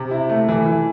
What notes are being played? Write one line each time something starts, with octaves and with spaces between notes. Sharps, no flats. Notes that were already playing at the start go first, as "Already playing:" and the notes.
Already playing: C3
E4
A3
E3
E3